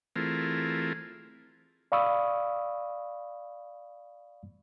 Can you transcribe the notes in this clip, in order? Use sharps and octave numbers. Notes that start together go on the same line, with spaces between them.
E3 A3 C4 F4 G#4 A#4
D5 F5 B5 C#6 D#6 E6